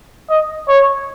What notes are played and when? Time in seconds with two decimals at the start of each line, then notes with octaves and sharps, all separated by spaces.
0.30 D#5
0.68 C#5